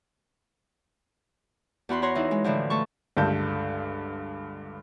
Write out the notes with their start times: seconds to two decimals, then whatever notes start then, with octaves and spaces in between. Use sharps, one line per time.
1.89 E2 F#4 B5 C6
2.02 F#4 C#5 A#5 C6
2.15 E3 D#4 E4
2.31 G#3
2.44 A2 D3 E3 F3
2.70 A3 A4 C#6
3.17 C#2 G2 D3 A3 A5 G6